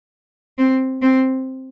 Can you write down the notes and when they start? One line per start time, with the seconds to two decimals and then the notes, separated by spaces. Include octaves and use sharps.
0.58 C4
1.02 C4